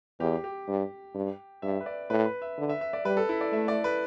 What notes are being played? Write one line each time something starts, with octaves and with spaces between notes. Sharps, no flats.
E2 G4
G4
G2
G2
G2 E5
B4
D5
A2 B4
B4
E5
D3
E5
E5
D5
G3 B4
A4
E4
D5
A3 E5
D5
B4